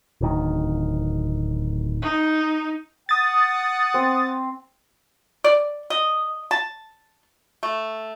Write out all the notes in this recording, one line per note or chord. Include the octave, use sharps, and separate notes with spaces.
D1 D#3
D#4
F#5 D#6 A6
C4
D5
D#5
A5
A3